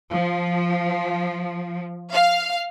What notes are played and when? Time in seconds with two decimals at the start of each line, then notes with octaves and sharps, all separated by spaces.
0.12 F3
2.12 F5